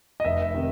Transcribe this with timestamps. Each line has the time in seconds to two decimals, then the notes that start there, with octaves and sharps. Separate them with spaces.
0.20 D#5
0.25 F1 E5
0.54 C3 D#3